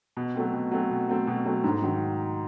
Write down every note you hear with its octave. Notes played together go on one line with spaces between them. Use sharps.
B2
F#3 A3 C4
B2
F#3 A3 C4
B2
F#3 A3 C4
B2
F#3 A3 C4
G#2
D#3 F#3